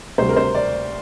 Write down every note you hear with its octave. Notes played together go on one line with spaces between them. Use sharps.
D2 C3 G3 C5
A#4
C5
D5